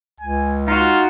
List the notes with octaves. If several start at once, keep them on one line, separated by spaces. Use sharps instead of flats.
C#2 G#5
D#4 F4 F#4